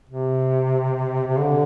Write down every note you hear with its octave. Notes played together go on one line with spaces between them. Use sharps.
C3
C3
D3